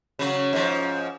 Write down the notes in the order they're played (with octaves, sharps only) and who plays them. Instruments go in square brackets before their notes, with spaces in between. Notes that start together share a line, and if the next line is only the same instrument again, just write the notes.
[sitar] C#3 F#3
G#2 F3